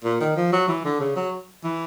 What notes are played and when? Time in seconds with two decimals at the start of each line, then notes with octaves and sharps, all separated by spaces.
0.04 A#2
0.20 D#3
0.36 F3
0.52 F#3
0.68 E3
0.85 D3
1.00 C#3
1.16 F#3
1.64 E3